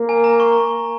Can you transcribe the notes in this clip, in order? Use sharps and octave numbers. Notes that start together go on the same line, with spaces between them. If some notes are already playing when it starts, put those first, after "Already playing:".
Already playing: A#3
G#5
A#5
C#6